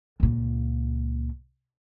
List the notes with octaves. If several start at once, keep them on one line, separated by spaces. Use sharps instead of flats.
C#2 A#2